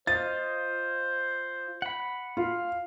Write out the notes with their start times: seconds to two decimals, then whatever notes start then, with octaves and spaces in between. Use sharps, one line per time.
0.07 F4 C5 D#5 A6
1.82 F#5 B5
2.37 F4 F5